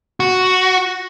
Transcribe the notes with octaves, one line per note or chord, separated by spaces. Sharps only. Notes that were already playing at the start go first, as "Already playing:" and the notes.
F#4